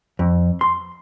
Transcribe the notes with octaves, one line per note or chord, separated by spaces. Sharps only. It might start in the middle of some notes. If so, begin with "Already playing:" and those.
F2
C6